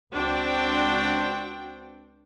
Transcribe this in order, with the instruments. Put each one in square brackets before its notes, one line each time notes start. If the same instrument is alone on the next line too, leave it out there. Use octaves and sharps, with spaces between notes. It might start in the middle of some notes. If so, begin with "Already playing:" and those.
[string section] C#2 C4 D4 F#4 C5 G5